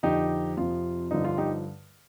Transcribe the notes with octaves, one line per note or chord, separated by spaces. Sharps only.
F2 D3 F3 D#4 G4
F2 C3 F3 F4
G2 D3 F3 D#4
F4
D#4 G4